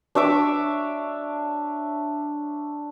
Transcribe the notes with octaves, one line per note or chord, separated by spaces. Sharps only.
D4 C#5 E5 D6